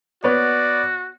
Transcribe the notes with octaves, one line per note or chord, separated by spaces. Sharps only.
B3 F#4 B4 C#5 D5